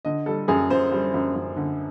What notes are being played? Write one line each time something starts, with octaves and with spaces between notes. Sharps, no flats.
D3 D#5
G3 A4
F#2 G#4
F#2 C5
G3
F#2
F#2
D3